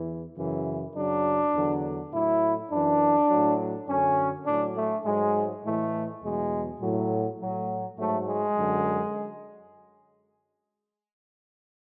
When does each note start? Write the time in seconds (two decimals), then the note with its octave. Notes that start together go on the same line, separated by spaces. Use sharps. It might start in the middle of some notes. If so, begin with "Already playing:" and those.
Already playing: E2 E3
0.37 F#2 C#3 E3
0.95 F#2 C#3 F#3 D4
1.54 E2 D3 F#3
2.12 A2 F#3 E4
2.71 F#2 E3 D4
3.30 A2 F#3
3.88 F#2 D3 F#3 C#4
4.46 A2 F#3 D4
4.76 A3
5.05 G#2 F#3 G#3
5.63 A2 E3 A3
6.22 E2 B2 F#3 G#3
6.81 A2 F#3
7.39 A2 F#3
7.98 G#2 F#3 A3
8.27 G#3
8.56 F#2 D3 F#3